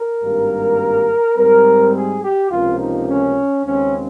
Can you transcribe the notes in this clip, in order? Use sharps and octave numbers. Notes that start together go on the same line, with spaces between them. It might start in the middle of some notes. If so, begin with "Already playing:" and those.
Already playing: A#4
G#1 G2 G3 A#3
G#2 G3 C4 A#4
G#4
G4
C#2 C3 F3 A#3 F4
D#4
C#4
D#2 C#3 G#3 C4 C#4